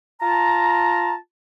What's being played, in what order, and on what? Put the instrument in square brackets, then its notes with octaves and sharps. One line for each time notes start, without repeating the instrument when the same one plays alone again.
[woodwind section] F4 A5 A#5